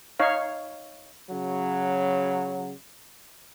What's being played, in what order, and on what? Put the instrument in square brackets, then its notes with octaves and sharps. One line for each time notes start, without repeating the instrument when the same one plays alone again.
[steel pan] D#4 C#5 F5
[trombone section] C#3 F#3